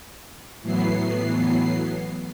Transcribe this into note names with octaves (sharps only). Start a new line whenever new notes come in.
A2 E3 F#3 B3 C7